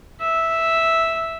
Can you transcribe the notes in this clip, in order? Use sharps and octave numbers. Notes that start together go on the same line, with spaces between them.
E5